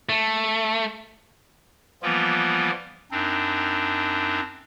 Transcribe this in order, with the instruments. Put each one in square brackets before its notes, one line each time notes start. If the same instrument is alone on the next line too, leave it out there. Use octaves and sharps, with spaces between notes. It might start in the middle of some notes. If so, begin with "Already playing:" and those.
[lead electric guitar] A3
[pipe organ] E3 F3 G3 A#3 B3 F4
F#2 C4 D4 D#4